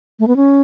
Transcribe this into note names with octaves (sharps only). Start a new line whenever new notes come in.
A3
B3
C#4